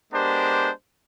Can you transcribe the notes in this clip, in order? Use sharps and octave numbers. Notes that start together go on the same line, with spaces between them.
G#3 B3 D4 G4 A#4 C5